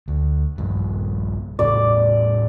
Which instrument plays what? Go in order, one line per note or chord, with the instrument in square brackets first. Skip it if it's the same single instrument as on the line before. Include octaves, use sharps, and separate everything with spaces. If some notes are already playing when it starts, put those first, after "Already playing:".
[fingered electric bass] D2
A#1 G2
[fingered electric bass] A2 C#3 G3 [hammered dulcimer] D5